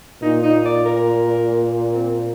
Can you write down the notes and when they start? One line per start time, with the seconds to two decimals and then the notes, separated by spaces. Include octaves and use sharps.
0.22 A#2 D#4
0.43 D#4
0.65 D5
0.86 A#4
1.93 C4